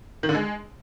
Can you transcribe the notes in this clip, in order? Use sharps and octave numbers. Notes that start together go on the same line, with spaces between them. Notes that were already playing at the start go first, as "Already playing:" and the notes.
D#3
D3
G#3